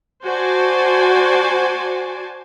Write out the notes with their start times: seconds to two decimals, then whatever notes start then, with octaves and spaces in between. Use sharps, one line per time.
0.24 F#4 C5 D5 G#5 A5